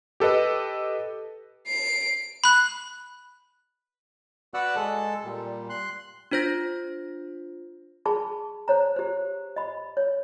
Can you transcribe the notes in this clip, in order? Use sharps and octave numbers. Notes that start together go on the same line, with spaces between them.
G4 A4 B4 D#5
C7 D7
B5 F#6
F#4 B4 D5 F#5 E6 F#6
G#3 A4 A5
A#2 G3
C6 F#6
D4 F4 C5 G6 A#6
G#4 A5 B5 C#6
C5 C#5 A#5
G4 C5
D#5 B5
C#5